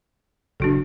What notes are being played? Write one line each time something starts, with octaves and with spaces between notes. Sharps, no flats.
F#1 A2 D4 F#4 A4